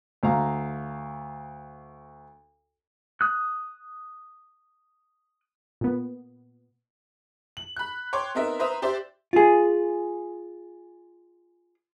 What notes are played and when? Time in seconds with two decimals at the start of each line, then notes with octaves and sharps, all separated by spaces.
0.23 D2 F5 A#5
3.21 D#6 F#6
5.81 A#2 B3
7.57 F#7
7.76 B5 F#6
8.13 C#5 G5 C6 D6
8.35 B3 C4 D#4 A#4 E5
8.59 B4 C5 E5 A#5 D#6
8.82 G4 C5 D5 E5
9.33 F4 G#4